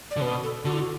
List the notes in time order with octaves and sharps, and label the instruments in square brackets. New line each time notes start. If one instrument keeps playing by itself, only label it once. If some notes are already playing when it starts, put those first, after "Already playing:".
[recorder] D5
[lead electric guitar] D3
[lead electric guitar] B2 [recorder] B4
[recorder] A4
[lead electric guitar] D3 [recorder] F#4
[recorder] E4
F#4